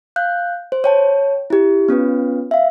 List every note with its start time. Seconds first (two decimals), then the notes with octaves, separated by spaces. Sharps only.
0.16 F5 F#6 G6
0.72 C5
0.84 C#5 G5 A5
1.50 E4 G4
1.89 B3 C#4 F4 B4
2.51 E5 F5